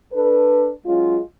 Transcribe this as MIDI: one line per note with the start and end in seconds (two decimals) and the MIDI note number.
0.13 0.71 62
0.13 0.71 69
0.13 0.71 71
0.86 1.19 54
0.86 1.19 56
0.86 1.19 61
0.86 1.19 65